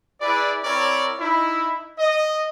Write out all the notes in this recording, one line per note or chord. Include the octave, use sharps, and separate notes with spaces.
E4 G#4 B4 D5
C4 E4 A#4 C#5 D5
D#4 E4
D#5